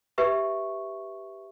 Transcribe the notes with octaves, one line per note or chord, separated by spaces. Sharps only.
G4 B4 E5 C#6